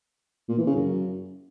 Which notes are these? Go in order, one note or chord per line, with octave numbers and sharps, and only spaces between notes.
A#2
E3
C#3
F#2